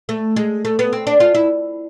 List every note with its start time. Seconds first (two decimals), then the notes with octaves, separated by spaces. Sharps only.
0.09 A3
0.36 G#3
0.65 A3
0.79 B3
0.93 C4
1.07 D4
1.20 F4
1.35 E4